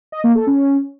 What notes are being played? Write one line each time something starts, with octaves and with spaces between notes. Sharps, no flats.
D#5
A#3
A4
C#4